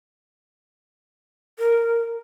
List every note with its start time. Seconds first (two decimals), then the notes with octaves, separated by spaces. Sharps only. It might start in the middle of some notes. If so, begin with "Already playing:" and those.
1.59 A#4